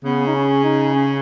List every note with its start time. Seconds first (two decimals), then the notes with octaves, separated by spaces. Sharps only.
0.04 C#3 B3
0.27 D#4
0.35 C#4
0.64 D#4
0.94 C#4